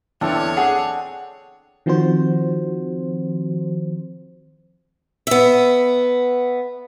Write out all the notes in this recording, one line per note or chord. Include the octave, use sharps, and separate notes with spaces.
E2 D3 C4 D4 A4 C#5
G#4 F#5
D#3 F3 C4 F#4 C5
B3 E5